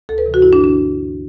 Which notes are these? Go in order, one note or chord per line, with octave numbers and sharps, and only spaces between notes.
D2 A4
B4
C3 E3
F#4
G2 E4
D4
D3
D4